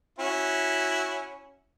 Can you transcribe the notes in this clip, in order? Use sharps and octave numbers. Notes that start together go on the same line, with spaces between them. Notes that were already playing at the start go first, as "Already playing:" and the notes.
C#4 E4 F#4